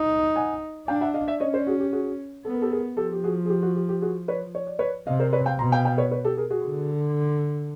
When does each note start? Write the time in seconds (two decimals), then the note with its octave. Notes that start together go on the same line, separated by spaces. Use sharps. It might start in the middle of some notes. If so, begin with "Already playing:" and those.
Already playing: D#4
0.36 F#5 G#5
0.87 D4 F5 G5
1.01 E5 F#5
1.14 D#5 F5
1.28 D5 E5
1.40 C#4 C#5 D#5
1.54 C5 D5
1.67 F#4 G#4
1.80 G4
1.93 F#4 G#4
2.45 B3 A4
2.53 A#4
2.62 G4 A4
2.71 G#4 A#4
2.97 F3 G4 A4
3.12 G4
3.24 F#4 G#4
3.45 G#4
3.50 G4
3.63 F#4
3.76 G4
3.89 G4
4.02 F#4 G#4
4.28 B4 C#5
4.55 C#5
4.67 D5
4.79 B4 C#5
5.07 C3 D#5 F5
5.20 A#4 C5
5.33 B4 C#5
5.46 F5 G5
5.59 B2 A#5 C6
5.72 F5 G5
5.85 F5 G5
5.98 B4 C#5
6.11 B4 C#5
6.25 G4 A4
6.37 G#4 A#4
6.50 F#4 G#4
6.63 D3